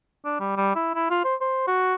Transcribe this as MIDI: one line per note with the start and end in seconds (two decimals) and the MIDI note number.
0.25 0.37 62
0.40 0.52 55
0.57 0.71 55
0.75 0.92 64
0.95 1.06 64
1.10 1.21 65
1.24 1.35 72
1.41 1.65 72
1.67 1.95 66